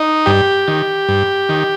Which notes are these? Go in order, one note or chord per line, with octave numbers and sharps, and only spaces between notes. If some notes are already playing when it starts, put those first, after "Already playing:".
Already playing: D#4
G2 G4
D#3
G2
D#3